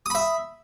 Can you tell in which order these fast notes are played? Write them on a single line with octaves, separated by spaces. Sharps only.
D#6 B5 E5